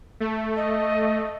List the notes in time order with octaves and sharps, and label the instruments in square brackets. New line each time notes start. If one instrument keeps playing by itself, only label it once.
[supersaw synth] A3
[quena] D#5